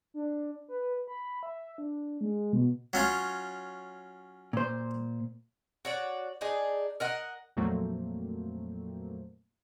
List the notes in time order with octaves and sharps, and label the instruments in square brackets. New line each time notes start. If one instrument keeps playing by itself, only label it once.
[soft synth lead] D4
B4
B5
E5
D4
G#3
B2
[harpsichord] F#3 C#4 F4
[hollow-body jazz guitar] A#2 C5
[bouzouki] F#4 C#5 D5
D4 D#4 G#4
A#4 D#5 F#5
[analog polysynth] F2 A#2 F#3 A3 A#3 C4